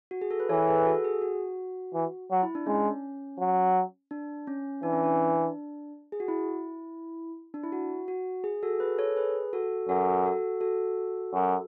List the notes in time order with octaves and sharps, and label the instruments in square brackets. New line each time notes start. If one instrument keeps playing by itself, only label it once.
[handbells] F#4
G#4
A4
B4
[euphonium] E3 [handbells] A4 C#5
[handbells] G#4 B4
F#4 A4
G#4
F#4
[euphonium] E3
F#3
[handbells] E4
D4
[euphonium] G#3 [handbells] C#4
[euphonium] F#3
[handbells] D4
C#4
[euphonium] E3 [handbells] D4
[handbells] C#4
D4
G#4
F#4
E4
D4
E4
F#4
F#4
G#4
F#4 A4
G#4 B4
A4 C#5
G#4 B4
F#4 A4
[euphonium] F#2 [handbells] F#4 A4
[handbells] F#4 A4
F#4 A4
[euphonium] F#2